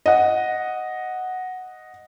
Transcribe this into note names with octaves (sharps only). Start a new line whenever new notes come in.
D#5 F#5